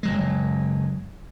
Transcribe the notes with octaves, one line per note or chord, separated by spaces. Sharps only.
F#1 F#3 G#3